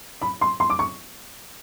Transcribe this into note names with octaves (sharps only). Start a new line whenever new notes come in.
B5
C6
C6
D6
C#6